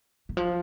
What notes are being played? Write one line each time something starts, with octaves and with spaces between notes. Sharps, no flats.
D#3
F3